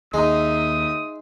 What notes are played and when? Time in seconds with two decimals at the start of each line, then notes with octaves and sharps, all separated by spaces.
0.14 D#2 G#3 D#4 E5 D#6